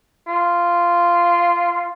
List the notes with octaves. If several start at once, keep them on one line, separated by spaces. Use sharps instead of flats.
F4